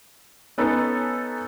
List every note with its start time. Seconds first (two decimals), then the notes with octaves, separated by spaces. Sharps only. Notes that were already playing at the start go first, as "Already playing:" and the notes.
0.58 B3 C#4 D#4 A4 B4